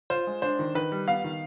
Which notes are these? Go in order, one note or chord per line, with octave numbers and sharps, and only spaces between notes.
F4 C5
G#3
D4 C5
D#3
D#3 B4
G3
B3 F5
D#3